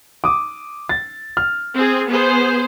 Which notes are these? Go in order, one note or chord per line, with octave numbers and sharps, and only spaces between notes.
D6 D#6
A6
F6
C4 G#4
B3 G#4 C5